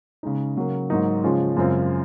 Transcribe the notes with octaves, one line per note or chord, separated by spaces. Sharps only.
C#3 G#3 D#4
C#3 F#3 A#3
G#2 F#3 A#3 D#4
C#3 F3 G#3 C#4 F4
F#2 C#3 G#3 C4 F4